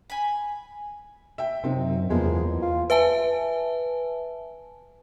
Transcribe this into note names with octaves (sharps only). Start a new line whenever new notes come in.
G#5 B5
E5 G5
F#2 C3 C4 D#4
E2 F3 G#3 A#3 B3
F4
B4 E5 G#5 A5